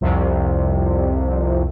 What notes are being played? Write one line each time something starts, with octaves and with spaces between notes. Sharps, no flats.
C2 F2 C3